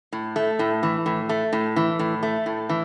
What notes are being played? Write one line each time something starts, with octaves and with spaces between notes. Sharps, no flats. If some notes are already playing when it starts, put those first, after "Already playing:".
A2
A3
A2
E3
A2
A3
A2
E3
A2
A3
A2
E3